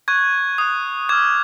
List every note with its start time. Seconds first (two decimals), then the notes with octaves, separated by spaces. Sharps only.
0.08 C#6 F#6 G#6
0.58 D#6 F#6
1.09 D6 F6 G#6